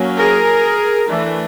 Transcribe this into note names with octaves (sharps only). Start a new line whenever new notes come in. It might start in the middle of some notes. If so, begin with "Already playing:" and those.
Already playing: F#3 A#3 C#4
G#4 A#4
E3 A3 D4